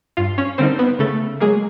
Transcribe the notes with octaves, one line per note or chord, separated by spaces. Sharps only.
G2 F4 F5
C#4 C#5
D3 G3 A#3 C4 D#4 C5
B3 B4
C#3 A3 A4
F#3 G#3 A#3 G#4